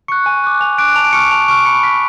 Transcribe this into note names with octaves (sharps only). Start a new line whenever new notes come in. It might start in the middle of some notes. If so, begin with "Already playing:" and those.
C#6 F#6 C#7
G#5
D6 F#6
G#5 F7
D6 F#6 D7
A5 F7
D7
C#6 F6 C#7
D7
A5 F7
C#6 F6 D7
B5 C#7
F6 B6